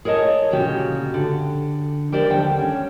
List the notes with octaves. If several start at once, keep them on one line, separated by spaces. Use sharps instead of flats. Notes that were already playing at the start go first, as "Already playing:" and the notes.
G#4 A#4 C#5 D#5 A5
D2 A#2 C#3 C#4 F#4 G4
D3
G4 A#4 C5 D5 G5
D#2 D3 G3 G5
C#4